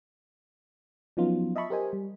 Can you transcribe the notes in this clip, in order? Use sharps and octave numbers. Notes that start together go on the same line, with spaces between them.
F3 F#3 B3 C#4 D#4 F4
D#5 E5 A5 B5 C#6
G4 A#4 C5 D#5 G#5
G3